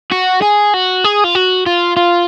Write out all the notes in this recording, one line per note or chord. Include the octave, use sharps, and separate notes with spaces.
F#4
G#4
F#4
G#4
F4
F#4
F4
F4